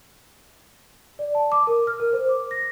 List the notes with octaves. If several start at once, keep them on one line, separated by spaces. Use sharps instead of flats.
D5
A5
D6
A#4
F6
A#4
C5
D6
A#6